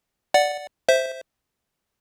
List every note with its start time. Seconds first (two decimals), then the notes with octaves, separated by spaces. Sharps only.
0.34 D5 F#5
0.89 C5 E5